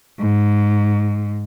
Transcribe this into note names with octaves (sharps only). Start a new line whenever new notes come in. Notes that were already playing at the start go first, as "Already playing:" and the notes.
G#2